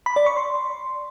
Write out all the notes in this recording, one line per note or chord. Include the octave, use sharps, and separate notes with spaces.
B5
D5
C#6
C6